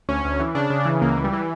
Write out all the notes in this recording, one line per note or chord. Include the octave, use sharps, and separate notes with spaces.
D2 C#4
D2
E3
C#3 D4
C#3
E3
C#2 A#3
E3
G3
E3